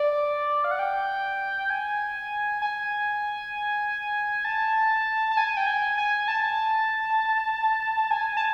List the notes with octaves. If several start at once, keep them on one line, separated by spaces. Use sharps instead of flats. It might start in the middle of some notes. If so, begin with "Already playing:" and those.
Already playing: D5
F5
F#5
G5
G#5
G#5
A5
A5
G#5
G5
G#5
G#5
A5
G#5
A5